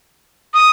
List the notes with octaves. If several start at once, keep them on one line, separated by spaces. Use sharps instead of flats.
D#6